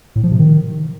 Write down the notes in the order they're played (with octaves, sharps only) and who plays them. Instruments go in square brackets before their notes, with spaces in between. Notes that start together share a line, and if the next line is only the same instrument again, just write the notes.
[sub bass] A2
F3
C3
D#3